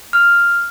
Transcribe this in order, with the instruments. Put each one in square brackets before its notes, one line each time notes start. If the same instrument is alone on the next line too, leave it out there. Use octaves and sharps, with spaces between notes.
[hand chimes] F6